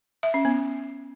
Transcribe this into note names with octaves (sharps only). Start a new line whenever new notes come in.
E5
C#4
B3